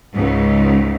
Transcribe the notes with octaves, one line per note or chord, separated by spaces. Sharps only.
C#2 G#2